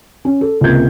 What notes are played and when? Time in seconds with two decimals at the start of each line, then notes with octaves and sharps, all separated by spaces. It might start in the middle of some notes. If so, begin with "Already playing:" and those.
0.25 C#4
0.41 A4
0.61 C#2 C3 A#3 G6 G#6